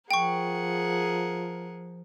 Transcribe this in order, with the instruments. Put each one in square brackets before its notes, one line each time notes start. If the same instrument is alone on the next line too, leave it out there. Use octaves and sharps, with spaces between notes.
[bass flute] F3 [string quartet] G#4 A#4 F#5 [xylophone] G5 C#6